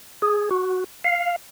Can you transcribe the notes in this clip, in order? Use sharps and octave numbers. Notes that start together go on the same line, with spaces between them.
G#4
F#4
F5